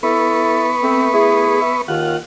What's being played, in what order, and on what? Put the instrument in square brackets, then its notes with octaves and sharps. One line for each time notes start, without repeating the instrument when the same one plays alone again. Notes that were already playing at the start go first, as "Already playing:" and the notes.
[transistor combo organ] B3 B4 C#6 [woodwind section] E4 A4
[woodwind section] A3 C4
A3 E4 G#4
E5
[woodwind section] D#2 D#3 [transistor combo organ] F4 F#5